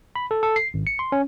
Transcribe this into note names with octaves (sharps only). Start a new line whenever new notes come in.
B5
A4
A4
C7
G#1
C#7
C6
C#4